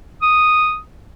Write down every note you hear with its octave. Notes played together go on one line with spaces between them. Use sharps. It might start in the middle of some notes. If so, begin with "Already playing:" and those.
D#6